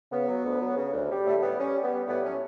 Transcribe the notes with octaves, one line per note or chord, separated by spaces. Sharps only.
C#3 B3
F#3
D2
F#3
C#3
D2
G3
A2 A3
A3
G3 B3
G3 C#4
G3
B3
G3
A2 B3
F#3 C#4